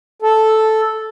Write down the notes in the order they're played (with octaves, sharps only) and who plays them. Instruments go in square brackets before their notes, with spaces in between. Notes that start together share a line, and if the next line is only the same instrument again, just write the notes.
[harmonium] A4